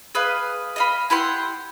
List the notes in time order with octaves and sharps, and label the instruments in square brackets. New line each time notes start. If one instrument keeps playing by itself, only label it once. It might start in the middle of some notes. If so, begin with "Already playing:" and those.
[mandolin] G#4 B4 D#5 F5
D#5 F5 B5
E4 G4 F#5 C6